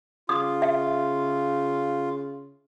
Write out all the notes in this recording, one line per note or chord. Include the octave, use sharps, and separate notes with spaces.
C#3 F4 D#6
E5